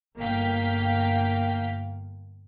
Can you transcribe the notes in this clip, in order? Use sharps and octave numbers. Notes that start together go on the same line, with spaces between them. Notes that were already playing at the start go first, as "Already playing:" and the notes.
G1 A#3 F5 G5 B6